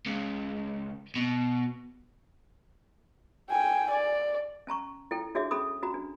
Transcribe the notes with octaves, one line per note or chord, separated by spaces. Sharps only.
C#2 C#3
B2
G5 G#5
D5
C#4 A5 A#5 C#6
E4 A4 G5
D4 F#4 G#4 C#5 E5 D6
C#4 G#4 A4 B5 D#6
C#4 F#4 A#5 B5
D4